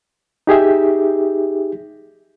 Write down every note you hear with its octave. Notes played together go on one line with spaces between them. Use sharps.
D#4 G4 G#4 E5